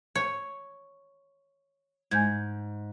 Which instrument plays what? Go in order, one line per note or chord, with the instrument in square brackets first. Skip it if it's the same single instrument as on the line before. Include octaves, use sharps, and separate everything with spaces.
[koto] C#5
[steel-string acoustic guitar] G#2 [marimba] G#5 G6 G#6